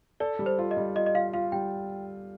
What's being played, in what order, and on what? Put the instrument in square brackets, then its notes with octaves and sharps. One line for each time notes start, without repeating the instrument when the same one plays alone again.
[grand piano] A4 [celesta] D5
[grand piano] G3
[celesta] C5
[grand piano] F4
[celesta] D#5
[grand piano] G3
[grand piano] F4 [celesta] D#5
[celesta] D#5
[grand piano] F4 [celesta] F5
[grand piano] F4 [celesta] F5
[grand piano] G3 [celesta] G5